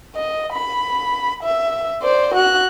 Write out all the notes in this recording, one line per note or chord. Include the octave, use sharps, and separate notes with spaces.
D#5
B5
E5
C5 D5
F#4 F#6